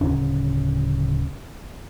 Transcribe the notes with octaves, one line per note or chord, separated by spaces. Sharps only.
D1 G1 C#3 C#4